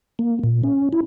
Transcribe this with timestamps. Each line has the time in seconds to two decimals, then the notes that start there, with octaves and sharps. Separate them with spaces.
0.19 A#3
0.44 A#2
0.63 C#4
0.93 E4